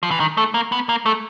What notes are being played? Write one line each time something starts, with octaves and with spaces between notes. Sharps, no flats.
F3
E3
D#3
A3
A#3
B3
A#3
A3